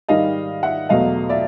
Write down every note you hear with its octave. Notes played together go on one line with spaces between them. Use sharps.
G#2 D#3 G3 D#5 F5
E5 F#5
E2 B2 F#3 A3 D#5 F5
D5 E5